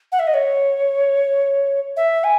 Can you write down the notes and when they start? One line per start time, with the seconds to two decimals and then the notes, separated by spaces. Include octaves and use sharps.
0.12 F#5
0.19 E5
0.27 D#5
0.34 C#5
1.96 E5
2.23 G#5